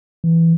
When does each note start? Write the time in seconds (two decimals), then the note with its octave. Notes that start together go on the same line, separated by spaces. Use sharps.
0.24 E3